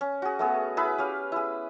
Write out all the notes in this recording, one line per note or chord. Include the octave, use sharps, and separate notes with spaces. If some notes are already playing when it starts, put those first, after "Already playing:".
C#4
F#4 G#4
A3 B3 G#4
E4 G#4 B4 B5
C#4 G4 F5
E4 G#4